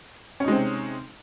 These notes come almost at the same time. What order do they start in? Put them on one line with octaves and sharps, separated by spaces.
C#4 D#4 G#3 C4 C3